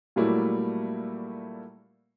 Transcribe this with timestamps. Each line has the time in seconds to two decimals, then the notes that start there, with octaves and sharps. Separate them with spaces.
0.16 A#2 F#3 G3 A3 A#3 E4